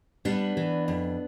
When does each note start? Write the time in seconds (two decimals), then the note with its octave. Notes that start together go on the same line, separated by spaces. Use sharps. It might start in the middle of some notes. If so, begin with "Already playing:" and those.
0.25 G3 B3 D4
0.57 E3
0.88 F2